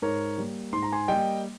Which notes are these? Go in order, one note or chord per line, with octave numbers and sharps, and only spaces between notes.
G#2 A#4 C#5
G3 A#3
G#2 C6
A#5
G#5 C6
G3 A#3 D#5 G5